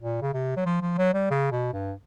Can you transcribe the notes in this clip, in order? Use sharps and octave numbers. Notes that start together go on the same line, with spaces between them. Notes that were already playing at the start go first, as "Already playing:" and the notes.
A#2
C#3
C3
F#3
F3
F3
F#3
G3
C#3
B2
G2